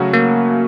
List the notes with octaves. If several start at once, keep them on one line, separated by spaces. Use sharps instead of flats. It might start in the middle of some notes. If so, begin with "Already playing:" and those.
Already playing: C#3 F#3 A3 C#4 F#4
A#3